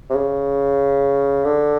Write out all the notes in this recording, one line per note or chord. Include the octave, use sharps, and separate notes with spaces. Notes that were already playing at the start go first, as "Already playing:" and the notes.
C3
C#3
D3